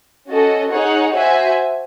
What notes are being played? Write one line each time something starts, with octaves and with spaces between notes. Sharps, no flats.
C#4 F#4 A4 D#5
D#4 G#4 C#5 F#5
F#4 C5 E5 G#5